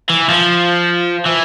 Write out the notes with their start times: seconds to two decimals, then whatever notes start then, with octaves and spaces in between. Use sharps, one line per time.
0.10 E3
0.30 F3
1.26 E3